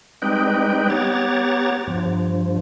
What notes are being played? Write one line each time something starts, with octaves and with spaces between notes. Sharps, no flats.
G3 G#3 C4 D#4 B4 G5
B3 G4 C#5 A#5 A6
G2 F3